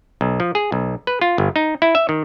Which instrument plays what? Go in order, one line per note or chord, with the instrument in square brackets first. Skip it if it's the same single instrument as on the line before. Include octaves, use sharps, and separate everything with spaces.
[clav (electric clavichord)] B1
F3
G#4
B1
B4
F4
G1
D#4
E4
E5
D#3